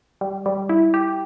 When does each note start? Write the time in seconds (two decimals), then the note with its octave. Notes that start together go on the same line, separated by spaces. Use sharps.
0.21 G3
0.46 G3
0.69 E4
0.94 G4